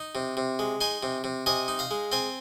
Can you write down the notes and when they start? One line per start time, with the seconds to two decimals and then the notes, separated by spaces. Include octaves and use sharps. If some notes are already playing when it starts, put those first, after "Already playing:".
Already playing: D#4
0.15 C3
0.37 C3
0.59 G#3
0.81 D#4 G#5 C6
1.03 C3
1.24 C3
1.46 C3 D#5 G#5
1.68 D#4
1.79 F5 A#5
1.91 G#3
2.12 C4 G#5 C6